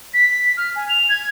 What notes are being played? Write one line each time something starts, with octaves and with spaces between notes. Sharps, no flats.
B6
F6
G#5
F7
G#6